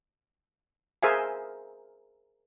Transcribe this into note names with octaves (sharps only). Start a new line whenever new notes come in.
G#4 A#4 C5 E5 F5 G#5